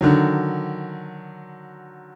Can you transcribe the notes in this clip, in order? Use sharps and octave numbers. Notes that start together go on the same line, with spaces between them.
D3 D#3 F#3